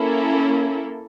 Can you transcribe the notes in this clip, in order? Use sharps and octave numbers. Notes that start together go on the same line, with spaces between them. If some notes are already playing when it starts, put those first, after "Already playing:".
Already playing: A#3 C#4 E4 A4